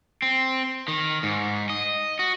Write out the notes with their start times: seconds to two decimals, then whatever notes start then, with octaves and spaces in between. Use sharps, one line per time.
0.22 C4
0.88 D#3
1.23 G#2
1.70 D#5
2.19 F#4